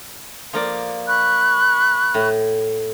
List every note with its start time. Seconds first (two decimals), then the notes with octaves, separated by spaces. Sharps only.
0.53 F3 A#3 D5
1.08 B5 C#6 F#6
2.14 A2